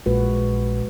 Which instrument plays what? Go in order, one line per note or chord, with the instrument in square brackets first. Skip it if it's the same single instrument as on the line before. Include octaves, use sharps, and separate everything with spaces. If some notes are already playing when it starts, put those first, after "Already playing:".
[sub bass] A#1 [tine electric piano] A#2 [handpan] G#3 F#4 B4